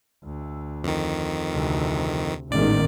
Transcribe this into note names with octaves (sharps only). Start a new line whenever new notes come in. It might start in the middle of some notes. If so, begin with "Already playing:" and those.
D2
F2 D#3
D2 C3
A1 E2 G#2 D#3 D5